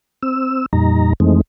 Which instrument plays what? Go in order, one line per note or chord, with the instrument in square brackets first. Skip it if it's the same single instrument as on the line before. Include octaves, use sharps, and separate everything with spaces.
[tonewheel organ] C4 E6
F2 A#2 G3 D#4 A#5
F2 E3 G#3 A3 C4 D#4